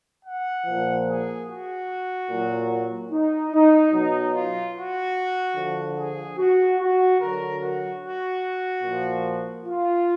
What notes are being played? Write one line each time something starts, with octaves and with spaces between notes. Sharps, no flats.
F#5
A#2 F3
G#4
F#4
A#2 F#3
D#4
D#4
B2 F#3 D#4
F4
F#4
D3 F3
G#4
F#4
F#4
D3 F#3 A#4
F#4
F#4
A#2 F3
F4